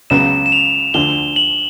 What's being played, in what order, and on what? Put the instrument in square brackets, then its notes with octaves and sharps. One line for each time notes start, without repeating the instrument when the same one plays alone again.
[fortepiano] C#2 C#3 F#3 B3 [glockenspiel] E7
[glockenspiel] E7
F7
[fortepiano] D2 D3 F3 [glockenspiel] G7
[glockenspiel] F#7